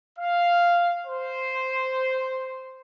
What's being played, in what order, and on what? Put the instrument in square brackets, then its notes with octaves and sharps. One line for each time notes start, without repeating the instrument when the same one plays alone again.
[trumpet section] F5
C5